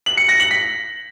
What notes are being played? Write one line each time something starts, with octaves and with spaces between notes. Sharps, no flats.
F#7
C#7
A#6
F#7
B6